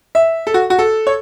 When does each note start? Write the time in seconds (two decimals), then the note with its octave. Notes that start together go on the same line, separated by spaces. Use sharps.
0.15 E5
0.47 A4
0.54 F#4
0.70 F#4
0.79 A4
1.07 C#5